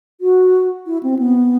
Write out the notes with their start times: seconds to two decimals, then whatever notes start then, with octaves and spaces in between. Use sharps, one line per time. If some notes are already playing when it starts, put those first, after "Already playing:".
0.21 F#4
0.86 E4
1.03 C4
1.19 B3